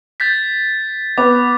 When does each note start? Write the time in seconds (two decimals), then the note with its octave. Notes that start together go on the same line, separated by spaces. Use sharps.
0.20 G6 A6 B6
1.18 B3 D6